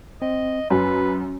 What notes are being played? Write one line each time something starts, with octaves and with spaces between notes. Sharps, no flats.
C4 D#5
F#2 C#4 B4